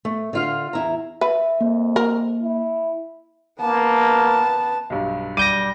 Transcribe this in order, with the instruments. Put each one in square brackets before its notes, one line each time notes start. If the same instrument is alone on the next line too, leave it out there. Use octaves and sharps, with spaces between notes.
[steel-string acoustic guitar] A3
D3 F4 F5
E2 E4 A#5
[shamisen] B4 [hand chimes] E5
[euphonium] F2 [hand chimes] A#3
[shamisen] A#4
[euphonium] E4
[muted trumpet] A#3 [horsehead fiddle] B3 A5
[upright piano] B1 G2
[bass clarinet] G3 [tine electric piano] D6 G6 A#6 [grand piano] D#7